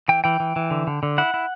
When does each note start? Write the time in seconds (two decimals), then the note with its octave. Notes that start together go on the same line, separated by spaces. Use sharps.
0.08 E3 G5
0.24 E3 G5
0.40 E3
0.56 E3
0.71 D3
0.87 D3
1.03 D3
1.18 E4 F#5
1.34 E4